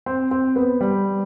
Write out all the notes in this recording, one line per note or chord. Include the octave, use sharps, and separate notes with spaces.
C4
C4
B3
G3